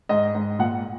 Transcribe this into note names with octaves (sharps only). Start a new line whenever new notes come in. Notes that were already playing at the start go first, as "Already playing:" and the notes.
G#2 D#5
G#2
A#2 F#5